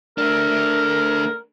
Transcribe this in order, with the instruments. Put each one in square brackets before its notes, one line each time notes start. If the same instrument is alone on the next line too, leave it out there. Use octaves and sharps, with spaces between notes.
[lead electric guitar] A3 D4 [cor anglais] A#4